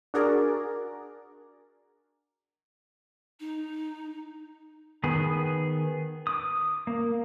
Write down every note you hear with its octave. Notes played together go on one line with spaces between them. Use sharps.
D4 F#4 G#4 A#4 D5
D#4
D#3 B3 G#4
D6 D#6
A#3